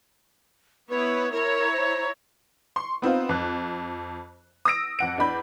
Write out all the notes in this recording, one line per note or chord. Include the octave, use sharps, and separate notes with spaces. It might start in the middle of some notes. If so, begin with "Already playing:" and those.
B3 E4 B4 C#5
E4 A#4 C#5 A#5
C5
C6 C#6
B3 C4 D#4 F4
F2 F#6
D#6 E6 A#6 D7
F2 F#5 D7
E2 D4 B5 G6